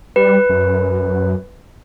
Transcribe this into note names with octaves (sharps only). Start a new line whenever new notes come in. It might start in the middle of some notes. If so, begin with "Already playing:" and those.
G3 B4
F#2